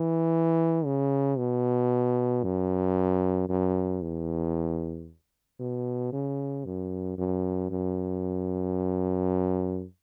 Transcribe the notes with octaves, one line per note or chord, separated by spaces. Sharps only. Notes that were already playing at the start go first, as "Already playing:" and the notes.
Already playing: E3
C#3
B2
F#2
F#2
E2
B2
C#3
F#2
F#2
F#2